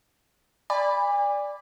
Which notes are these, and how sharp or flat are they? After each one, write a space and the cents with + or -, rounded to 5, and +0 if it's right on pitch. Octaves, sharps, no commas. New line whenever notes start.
D5 +0 G#5 -40 B5 +0